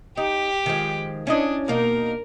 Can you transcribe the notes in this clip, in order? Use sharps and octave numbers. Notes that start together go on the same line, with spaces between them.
D#4 G4
D#3 F3 G#3
C#4 D4 E4 D#5
B2 A#3 D#4 A#4